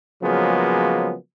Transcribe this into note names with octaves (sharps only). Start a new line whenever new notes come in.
C#3 F3 F#3 G#3 A#3 B3